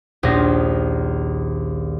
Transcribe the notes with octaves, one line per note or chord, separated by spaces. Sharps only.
A#1 D#2 D#3 C#4 F4 A#6